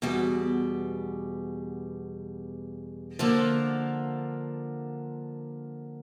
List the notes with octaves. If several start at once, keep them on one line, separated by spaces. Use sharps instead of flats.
E2 B2 G3
D3 F3 A#3 D4